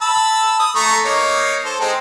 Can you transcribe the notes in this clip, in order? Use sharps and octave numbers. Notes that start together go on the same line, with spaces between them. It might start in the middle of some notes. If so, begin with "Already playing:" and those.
A5 B5 E6
D#6
A3 A#5 C#6
A#3 D#4 C#5
A4 C5
G#3 C4 D#4